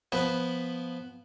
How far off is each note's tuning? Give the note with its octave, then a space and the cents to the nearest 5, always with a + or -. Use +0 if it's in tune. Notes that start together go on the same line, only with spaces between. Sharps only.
F3 +0 B3 +0 B4 +0